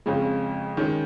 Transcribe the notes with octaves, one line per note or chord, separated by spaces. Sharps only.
F2 C#3 G#3 C#4
D#3 G#3 C#4